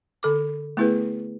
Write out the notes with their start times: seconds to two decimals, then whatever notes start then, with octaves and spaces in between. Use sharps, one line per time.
0.23 D3 A4 D6
0.77 A3 B3 E4 G#4 B4